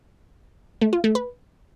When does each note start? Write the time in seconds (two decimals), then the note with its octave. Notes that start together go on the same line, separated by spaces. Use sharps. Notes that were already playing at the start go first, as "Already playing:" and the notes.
0.81 A3
0.93 F4
1.04 A3
1.15 B4